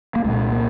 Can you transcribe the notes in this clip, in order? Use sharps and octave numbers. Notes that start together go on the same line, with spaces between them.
A#3
C2 A#2 G#3
A#3